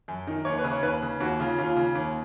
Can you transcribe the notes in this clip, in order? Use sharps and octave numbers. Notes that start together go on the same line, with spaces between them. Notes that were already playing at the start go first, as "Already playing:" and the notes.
F#2
D#3
D#2 C#5
B4
C#3
C#5
D#2 B4
C#3
D#2 F#4
C#3 F4
D#2 F4
C#3
D#2